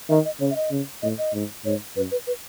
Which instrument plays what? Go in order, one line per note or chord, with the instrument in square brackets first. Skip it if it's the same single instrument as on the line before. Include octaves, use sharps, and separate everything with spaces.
[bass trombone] D#3 [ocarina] E5
[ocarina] D#5
[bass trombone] C#3 [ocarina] C#5
[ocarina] E5
D#5
[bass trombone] C#3
[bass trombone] A2 [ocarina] D#5
[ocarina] D#5
[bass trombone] G#2
[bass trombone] G#2 [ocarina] C#5
[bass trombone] F#2 [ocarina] B4
[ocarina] B4
B4